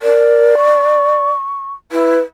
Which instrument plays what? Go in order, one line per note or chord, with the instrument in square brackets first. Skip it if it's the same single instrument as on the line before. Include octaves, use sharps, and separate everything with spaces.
[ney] A#4 [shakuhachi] D5
[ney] C#6
[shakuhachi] E4 [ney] B4